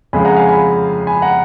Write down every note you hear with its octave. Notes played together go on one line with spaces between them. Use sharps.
F2 C#3 G#3 G#5 B5
F#5 A#5
F5 G#5
G#5 B5
G#5 B5
F#5 A#5